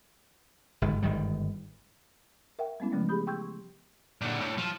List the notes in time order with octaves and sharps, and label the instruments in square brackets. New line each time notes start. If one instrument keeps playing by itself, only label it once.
[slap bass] G1 G#2 D#3
G1 G#2 D#3 G3
[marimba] A#4 E5 F#5 G5
G3 G#3 B3 C#4 E4
C#3 E3 F3 G#3 A3 C#4
G4 G#4 B5 D#6 G6
G5 C6 C#6 E6 G6 G#6
[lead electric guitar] A#2 D3
A2
F3